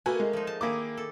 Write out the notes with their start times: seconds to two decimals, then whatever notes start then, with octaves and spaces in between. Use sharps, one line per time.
0.06 A3 A#3 F#4 B4 G#5
0.20 G#3
0.33 F3 D#4
0.47 A5
0.61 D#3 A#3 E4 G#4 D6
0.97 A4